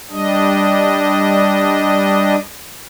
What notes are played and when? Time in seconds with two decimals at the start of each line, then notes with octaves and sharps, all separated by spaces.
0.11 G3 D4 D#5